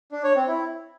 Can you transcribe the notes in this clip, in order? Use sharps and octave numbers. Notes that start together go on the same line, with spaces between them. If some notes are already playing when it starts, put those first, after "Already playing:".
D4
C#5
C4
E4